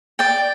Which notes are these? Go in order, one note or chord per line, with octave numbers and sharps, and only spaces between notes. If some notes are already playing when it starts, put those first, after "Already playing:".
D5 G5